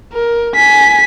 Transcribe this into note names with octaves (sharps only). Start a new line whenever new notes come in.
A#4
G#5 B6